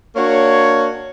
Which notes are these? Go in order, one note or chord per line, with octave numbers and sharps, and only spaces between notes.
A#3 D4 F#4 C#5